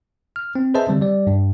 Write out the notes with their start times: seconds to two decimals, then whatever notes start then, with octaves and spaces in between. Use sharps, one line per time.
0.36 F6
0.55 C4
0.74 G#4 B4 C5 D#5 E5 A5
0.88 D3 G3 C4
1.02 G3 D5
1.27 G2